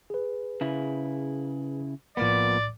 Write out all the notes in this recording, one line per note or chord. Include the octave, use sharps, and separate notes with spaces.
G#4 B4
C#3 E4
B1 A2 F3 A#3 B3 D5